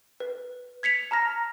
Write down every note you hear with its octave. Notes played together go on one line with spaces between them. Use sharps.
B4
G#6 B6 C#7 F7
A5 A#5 F6 A#6